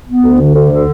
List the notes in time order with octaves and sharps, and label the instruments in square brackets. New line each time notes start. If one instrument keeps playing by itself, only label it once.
[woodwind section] B3
D2
D3
D2
D3